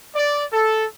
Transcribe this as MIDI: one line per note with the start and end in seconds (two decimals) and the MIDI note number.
0.15 0.43 74
0.53 0.84 69